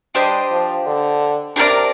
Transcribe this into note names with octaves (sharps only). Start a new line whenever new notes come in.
G3 D4 G4 C5 D#5
F3
D3
C3 D4 G4 A#4 D5